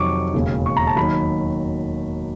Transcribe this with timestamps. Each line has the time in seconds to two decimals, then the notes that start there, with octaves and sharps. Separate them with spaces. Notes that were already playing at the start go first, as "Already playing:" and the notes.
Already playing: F2 C3 D#3 F#3 C#6 D6
0.34 E1 D#2 C#3
0.66 C#6
0.77 A#5
0.87 A5
0.96 D#2 D#3 F#3 B5